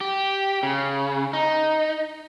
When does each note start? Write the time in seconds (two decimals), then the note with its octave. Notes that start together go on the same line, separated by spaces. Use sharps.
0.01 G4
0.63 C#3
1.33 D#4